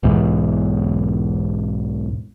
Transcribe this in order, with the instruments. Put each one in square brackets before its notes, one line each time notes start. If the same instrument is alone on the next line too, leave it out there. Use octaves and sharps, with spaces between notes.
[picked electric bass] B1 E2 G#2